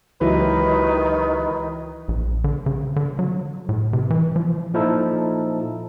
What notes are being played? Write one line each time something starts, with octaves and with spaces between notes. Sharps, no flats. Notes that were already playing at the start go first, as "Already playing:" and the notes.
C#2 D#3 E3 F#3 G4 B4 E5
A#1
D3
C#3
D3
F#3
A2
C3
E3
F3
A#2 F3 D#4 E4 A4